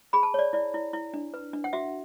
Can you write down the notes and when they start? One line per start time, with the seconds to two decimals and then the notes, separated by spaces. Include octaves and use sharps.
0.13 G#4 B5
0.23 A5
0.34 C#5 D5
0.53 E4 D5
0.74 E4
0.93 E4
1.14 D4
1.34 B4
1.53 D4
1.64 F#5
1.73 F#4 E5